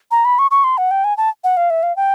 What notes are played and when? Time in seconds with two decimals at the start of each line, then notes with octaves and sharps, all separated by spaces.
0.11 A#5
0.25 B5
0.39 C#6
0.51 C#6
0.64 C6
0.78 F#5
0.91 G5
1.04 G#5
1.17 A5
1.44 F#5
1.57 F5
1.70 E5
1.83 F5
1.96 G5